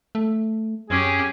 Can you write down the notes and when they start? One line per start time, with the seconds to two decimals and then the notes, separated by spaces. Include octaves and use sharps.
0.15 A3
0.90 F#2 C#4 G4 G#4